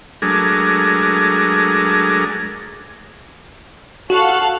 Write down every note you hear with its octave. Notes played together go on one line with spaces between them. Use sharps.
F#3 G#3 A3 D4 G#4 A#4
F#4 A4 F5 F#6